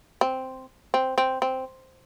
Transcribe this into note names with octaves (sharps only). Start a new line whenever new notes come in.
C4
C4
C4
C4